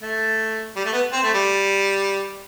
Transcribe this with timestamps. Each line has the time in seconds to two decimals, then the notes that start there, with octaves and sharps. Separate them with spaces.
0.02 A3
0.76 G3
0.85 A3
0.93 B3
1.13 C4
1.23 A3
1.34 G3